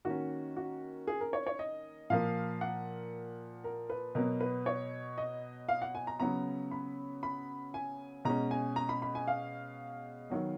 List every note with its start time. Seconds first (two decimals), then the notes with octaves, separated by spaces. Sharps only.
0.05 D#3 A#3 C#4 F#4
0.56 F#4
1.07 G#4
1.21 A#4
1.33 C#5
1.47 C#5
1.59 D#5
2.10 A#2 F3 A#3 F5
2.61 F#5
3.64 A#4
3.90 B4
4.15 B2 F#3 B3 A#4
4.41 B4
4.66 C#5
5.18 D#5
5.69 F5
5.82 F#5
5.95 G#5
6.07 A#5
6.20 C#3 F#3 B3 A#5
6.71 B5
7.23 B5
7.74 G#5
8.25 B2 G#3 C#4 A#5
8.51 G#5
8.76 A#5
8.89 B5
9.02 B5
9.15 G#5
9.27 F5
10.30 D#3 F#3 B3